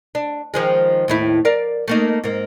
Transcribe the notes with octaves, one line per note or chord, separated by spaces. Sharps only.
D4
D#3 F3 G#3
D#2 A2 E4
A#4 D5 F5
A3 A#3 D#4
G#2 A#3